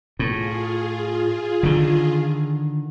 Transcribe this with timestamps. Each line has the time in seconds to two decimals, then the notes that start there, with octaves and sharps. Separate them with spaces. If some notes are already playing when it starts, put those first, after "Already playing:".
0.19 A2 F4 G#4
1.63 D3 D#3